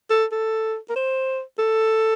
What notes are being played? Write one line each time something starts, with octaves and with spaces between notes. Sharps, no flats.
A4
A4
A#4
C5
A4